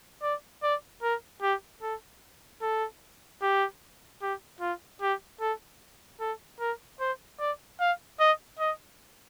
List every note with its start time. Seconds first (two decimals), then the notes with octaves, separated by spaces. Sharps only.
0.23 D5
0.63 D5
1.03 A#4
1.42 G4
1.82 A4
2.62 A4
3.42 G4
4.22 G4
4.61 F4
5.01 G4
5.41 A4
6.20 A4
6.60 A#4
7.00 C5
7.40 D5
7.80 F5
8.20 D#5
8.59 D#5